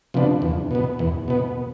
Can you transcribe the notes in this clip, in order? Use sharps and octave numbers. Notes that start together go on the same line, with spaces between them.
C3 F3 B3 D4
E2
B2 B3
E2
B2 B3